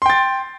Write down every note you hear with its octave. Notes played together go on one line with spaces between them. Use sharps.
G5 C6 A6